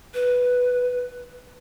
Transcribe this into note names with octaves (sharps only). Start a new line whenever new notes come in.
B4